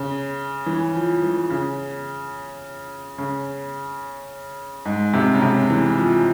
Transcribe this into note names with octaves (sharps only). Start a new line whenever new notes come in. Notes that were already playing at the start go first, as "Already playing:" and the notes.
Already playing: C#3
E3
F3
E3
C#3
C#3
G#2
C3
C#3
C3
E3
F3